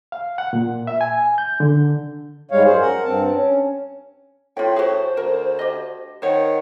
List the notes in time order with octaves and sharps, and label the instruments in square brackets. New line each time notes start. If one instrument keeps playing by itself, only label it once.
[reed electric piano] F5
F#5
A#2
E5
G#5
G6
D3
[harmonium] G#2 G3 G#3 C#5 F5
F#2 G#4 C5
A#4 F#5
G2 C4 A5
C#4
[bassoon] A2 [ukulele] F4 G5
[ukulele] F#4 G#4 [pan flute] C5
[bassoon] D2 [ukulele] A#4
[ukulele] G4 D#5
[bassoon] D#3 [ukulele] C5 C#5 [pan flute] F#5